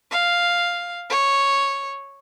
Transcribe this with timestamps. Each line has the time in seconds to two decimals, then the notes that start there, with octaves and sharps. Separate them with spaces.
0.11 F5
1.10 C#5